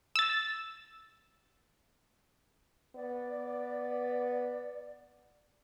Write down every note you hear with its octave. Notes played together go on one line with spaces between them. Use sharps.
E6 A6
B3 D5